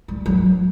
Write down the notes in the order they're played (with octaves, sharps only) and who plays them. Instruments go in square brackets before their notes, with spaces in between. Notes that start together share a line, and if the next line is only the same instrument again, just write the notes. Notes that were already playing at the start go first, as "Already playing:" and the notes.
[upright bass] G3
F#3